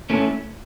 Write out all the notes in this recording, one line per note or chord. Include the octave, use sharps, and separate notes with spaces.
A3 C#4 E4 A4